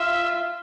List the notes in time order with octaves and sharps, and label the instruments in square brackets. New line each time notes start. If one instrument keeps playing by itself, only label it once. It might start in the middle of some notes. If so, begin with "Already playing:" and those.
Already playing: [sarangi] F4 [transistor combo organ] E5